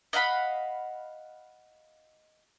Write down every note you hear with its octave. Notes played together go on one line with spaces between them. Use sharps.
D#5 F5 F#5 B5